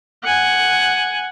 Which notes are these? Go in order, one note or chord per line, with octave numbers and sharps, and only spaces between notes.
F#5 G#5